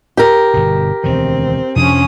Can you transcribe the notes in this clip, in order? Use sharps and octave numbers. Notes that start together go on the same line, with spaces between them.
G4 A#4
G1 B2
E1 D2 D#3 C4
F2 C3 F3 C#4 D4 D#6